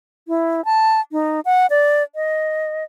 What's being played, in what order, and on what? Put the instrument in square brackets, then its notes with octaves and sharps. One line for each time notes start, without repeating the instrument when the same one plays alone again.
[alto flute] E4
A5
D#4
F#5
D5
D#5